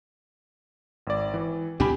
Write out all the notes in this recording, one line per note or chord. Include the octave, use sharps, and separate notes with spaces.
G#1 D5
E3
C#2 B2 D4 G4 G#5 B5